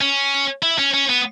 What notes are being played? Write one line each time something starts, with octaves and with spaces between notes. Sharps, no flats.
C#4
E4
C#4
C#4
B3